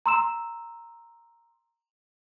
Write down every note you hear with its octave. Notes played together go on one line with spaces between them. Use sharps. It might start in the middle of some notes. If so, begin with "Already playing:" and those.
A#5 C6 E6 E7